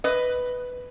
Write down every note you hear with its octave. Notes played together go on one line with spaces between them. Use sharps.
B4 D#5